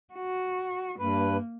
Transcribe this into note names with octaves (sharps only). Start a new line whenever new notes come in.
F#4
G2 A#3 B4